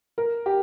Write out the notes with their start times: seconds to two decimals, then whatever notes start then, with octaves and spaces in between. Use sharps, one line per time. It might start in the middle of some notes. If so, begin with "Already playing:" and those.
0.18 A#4
0.46 G4